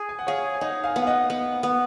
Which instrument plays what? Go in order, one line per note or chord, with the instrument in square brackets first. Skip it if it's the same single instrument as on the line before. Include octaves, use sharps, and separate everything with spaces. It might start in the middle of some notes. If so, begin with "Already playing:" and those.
Already playing: [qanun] G#4
[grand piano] G#5
F#5
[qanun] G#4 [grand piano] C#5 F5
[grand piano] G#5
[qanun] D#4 [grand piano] D#5 F#5
[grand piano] F5 G#5
[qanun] B3
[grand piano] F5
D#5 F#5
[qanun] B3
B3